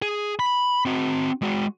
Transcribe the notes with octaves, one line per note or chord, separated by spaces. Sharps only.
G#4
B5
C4 F#4
G#3 F#4